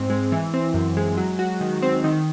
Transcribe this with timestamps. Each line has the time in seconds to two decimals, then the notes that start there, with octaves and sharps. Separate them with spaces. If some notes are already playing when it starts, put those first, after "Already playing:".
Already playing: G#2 C4
0.10 G#3
0.32 E3
0.54 C4
0.74 F#2
0.97 G#3
1.17 F#3
1.39 F#4
1.61 D#3
1.82 C4
2.04 D#3